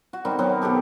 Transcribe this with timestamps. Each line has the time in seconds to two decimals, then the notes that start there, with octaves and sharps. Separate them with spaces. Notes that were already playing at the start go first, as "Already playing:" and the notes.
0.13 F#4
0.25 D#3 G3 C4
0.39 F#3 G3 B3 C4
0.62 B2 B3 G4 A4